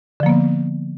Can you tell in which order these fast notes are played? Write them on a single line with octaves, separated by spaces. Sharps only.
D3 F3 A#3 B3